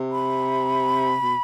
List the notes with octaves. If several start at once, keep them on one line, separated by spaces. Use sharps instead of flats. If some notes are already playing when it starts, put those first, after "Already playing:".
Already playing: C3
B5
B2